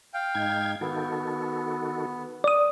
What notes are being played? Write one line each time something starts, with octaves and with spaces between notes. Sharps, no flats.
F5 G5
G#2 D#4 G#6
D#3 B3 F#4 A4
D5 D#6